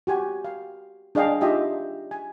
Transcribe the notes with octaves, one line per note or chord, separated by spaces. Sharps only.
F#4 G4 G#5
F5
D4 G#4 D#5 F5 G5
D#4 F4 G4 D#5 E5
G#5